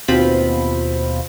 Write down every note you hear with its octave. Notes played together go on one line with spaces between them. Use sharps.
D#2 B2 C4 F4 B5